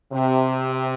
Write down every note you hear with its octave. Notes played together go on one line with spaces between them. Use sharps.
C3